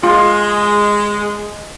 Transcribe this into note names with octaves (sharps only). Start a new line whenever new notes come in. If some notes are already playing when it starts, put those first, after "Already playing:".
G#3 F4